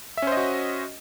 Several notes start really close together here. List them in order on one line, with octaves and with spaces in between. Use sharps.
E5 C#4 C5 D#5 F#4